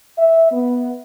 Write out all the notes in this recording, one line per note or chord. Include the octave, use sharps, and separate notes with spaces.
E5
B3